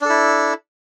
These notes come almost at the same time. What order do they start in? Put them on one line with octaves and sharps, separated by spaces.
D4 A4 E4